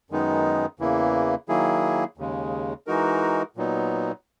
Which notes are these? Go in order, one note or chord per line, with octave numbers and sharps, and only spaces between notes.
F#2 D#3 G#3 B3 D#4
E2 C#3 E3 A#3 E4
D#3 F#3 A#3 E4 G#4
D#2 C#3 G#3
E3 G#3 D#4 F#4 A#4
A#2 F#3 B3 D#4